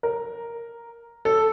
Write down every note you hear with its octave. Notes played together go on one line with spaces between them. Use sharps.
A#4
A4